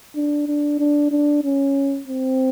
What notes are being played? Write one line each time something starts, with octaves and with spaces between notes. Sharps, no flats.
D4
D4
D4
D4
C#4
C4